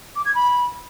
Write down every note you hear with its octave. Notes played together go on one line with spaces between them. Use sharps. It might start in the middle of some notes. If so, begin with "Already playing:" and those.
D6
G#6
B5